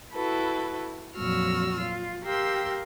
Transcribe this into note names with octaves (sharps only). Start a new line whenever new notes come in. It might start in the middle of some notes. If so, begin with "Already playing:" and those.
E4 F#4 A4 B4
F2 A#2 F#3 F#4 E6 F6
F4
G4 A#4 F5 G5 C6 E6